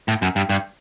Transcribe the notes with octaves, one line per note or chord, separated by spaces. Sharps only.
A2
F#2
G2
G2